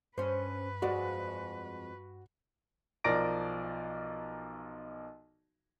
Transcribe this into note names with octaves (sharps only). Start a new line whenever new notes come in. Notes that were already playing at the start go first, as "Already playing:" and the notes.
G2 C#4 B4 C5
F2 G#3 F#4 D5
B1 F3 A#4 D5 A#6 D7